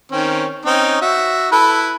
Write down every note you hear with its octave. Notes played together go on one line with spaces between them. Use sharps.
D#3 C4 C#4
C4 C#4 D#4
F#4 E5
E4 A4 B4